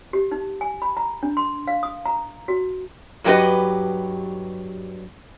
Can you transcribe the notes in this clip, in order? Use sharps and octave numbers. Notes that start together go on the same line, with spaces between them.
G4
D#4
G#5
B5
A#5
D4
C6
F5
D#6
A#5
F#4
G2 F#3 A3 G4 B4 D#5